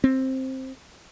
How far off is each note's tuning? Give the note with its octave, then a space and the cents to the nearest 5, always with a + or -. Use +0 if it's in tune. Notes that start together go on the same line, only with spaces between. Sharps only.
C4 +10